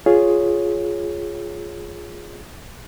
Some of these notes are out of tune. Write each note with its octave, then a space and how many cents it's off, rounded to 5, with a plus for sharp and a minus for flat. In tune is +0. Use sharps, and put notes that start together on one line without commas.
F4 +0 G#4 +0 C#5 +0